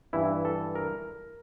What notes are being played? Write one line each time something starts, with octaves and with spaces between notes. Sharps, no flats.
G2 E3 E4
A4
A#4